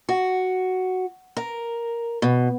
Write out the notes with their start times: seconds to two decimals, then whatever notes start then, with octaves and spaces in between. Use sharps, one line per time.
0.09 F#4
1.37 A#4
2.22 B2